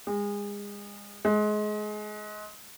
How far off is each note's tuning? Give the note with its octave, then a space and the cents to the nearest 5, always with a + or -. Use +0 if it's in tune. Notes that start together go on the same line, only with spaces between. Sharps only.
G#3 -30
G#3 +25